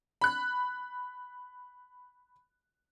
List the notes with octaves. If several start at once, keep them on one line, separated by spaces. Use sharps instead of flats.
B5 F#6